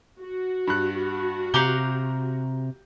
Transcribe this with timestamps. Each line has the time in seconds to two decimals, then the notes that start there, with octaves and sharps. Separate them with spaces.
0.21 F#4
0.67 G2 F#6
1.54 C3 G4 F5 F#5 A#5 G6 G7